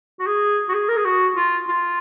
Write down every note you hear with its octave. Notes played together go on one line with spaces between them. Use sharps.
F#4
G#4
F#4
G#4
A#4
G#4
F#4
F4
F4